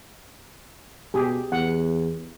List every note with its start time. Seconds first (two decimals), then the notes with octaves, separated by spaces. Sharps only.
1.14 B2 G4 G#4
1.52 E2 F#5